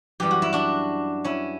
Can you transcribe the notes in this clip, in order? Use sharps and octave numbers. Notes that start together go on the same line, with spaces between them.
F#2 E3 G3 G4
F#4
E4
D4 F#4
C#4 E4